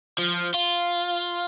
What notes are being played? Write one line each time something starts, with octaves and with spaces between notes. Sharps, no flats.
F3
F4